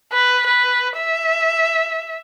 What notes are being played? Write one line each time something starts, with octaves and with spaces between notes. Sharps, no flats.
B4
B4
E5